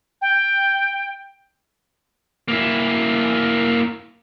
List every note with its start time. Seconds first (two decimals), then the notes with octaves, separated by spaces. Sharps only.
0.22 G5
2.48 A#3 E4